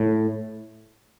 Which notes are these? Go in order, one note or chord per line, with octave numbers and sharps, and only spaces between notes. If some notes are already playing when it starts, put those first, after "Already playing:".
Already playing: A2